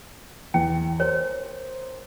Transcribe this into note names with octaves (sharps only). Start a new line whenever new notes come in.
E2 G5
A#4 C5 C#5